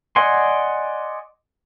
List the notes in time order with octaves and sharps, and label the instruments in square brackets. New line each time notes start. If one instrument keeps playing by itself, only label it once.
[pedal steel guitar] D5 D#5 F#5 G#5 C6